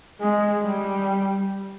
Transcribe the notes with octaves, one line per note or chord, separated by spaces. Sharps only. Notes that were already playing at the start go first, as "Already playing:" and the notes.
G#3
G3